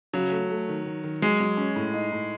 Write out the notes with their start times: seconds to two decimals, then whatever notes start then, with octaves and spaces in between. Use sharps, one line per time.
0.13 C#3 F#3
0.32 A3
0.50 A3
0.68 D#3
0.85 D#3
1.03 D#3
1.22 F#3 G#3
1.40 F#3
1.57 C#4
1.76 A2
1.94 D#4
2.12 A2